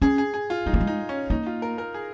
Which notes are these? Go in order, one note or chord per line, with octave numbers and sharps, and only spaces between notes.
C#4 G#4
G#4
G#4
F4
G#3 D#4
A#3
G#3
D#4
C#4
A#3 D#4
F4
A#4
A#4
G#4